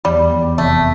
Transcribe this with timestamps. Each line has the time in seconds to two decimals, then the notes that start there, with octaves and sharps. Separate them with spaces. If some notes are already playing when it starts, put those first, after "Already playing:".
0.05 E2 G3
0.31 E2
0.58 F1 A3